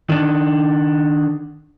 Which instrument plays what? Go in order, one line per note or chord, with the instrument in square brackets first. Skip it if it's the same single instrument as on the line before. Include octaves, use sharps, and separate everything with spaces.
[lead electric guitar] D#3 D4